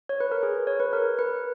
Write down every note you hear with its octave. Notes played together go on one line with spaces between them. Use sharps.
C#5
B4
A#4
G#4
C#5
B4
A#4
B4